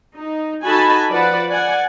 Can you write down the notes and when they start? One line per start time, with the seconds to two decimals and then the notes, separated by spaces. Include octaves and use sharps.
0.17 D#4
0.64 D#4 F#4 A4 G#5 A5 B5
1.11 F3 B4 D5 F#5 A5
1.51 D5 F#5 G#5